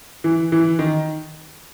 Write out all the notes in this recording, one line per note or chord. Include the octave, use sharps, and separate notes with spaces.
E3
E3
D#3